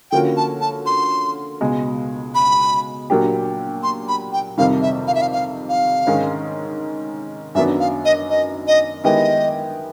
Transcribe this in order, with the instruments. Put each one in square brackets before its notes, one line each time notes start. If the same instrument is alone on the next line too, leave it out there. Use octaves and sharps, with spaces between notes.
[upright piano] D3 F3 A#3 C#4 F#4 [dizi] G5
[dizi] A5
A5
C6
[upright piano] C#2 B2 G#3
[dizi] B5
[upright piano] A#2 F#3 A#3 D4 G4
[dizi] C6
B5
G5
[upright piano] F2 C3 D#3 G3 [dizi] F5
[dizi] E5
F5
E5
F5
F5
F5
[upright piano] G#2 D#3 G#3 C#4
[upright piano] F#2 D#3 F#3 B3 D4 [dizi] E5
[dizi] F5
D#5
D#5
D#5
[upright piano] D#3 G#3 B3 E4 G4 [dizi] D#5